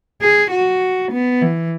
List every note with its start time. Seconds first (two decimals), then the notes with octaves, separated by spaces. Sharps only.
0.22 G#4
0.51 F#4
1.11 B3
1.42 E3